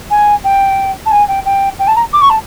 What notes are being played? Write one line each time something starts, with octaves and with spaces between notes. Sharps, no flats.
G#5
G5
A5
G#5
G5
G5
G5
A5
A#5
D6
C#6
A5